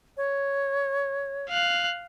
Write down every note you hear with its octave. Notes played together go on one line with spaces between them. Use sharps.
C#5
F5 F#6